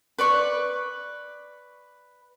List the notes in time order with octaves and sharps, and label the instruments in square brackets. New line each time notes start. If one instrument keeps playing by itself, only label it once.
[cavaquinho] B4 D5 C#6